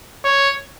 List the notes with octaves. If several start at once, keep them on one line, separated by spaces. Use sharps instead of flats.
C#5